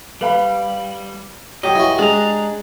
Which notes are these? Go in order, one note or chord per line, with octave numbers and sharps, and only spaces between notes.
G3 B4 F5 B5
F#3 G4 D#5
E3 F#4
G#3 D4 A#5